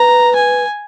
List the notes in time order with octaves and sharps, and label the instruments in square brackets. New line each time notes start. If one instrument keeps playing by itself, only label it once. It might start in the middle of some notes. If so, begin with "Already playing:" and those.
Already playing: [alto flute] B4 [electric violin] A#5
[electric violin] G#5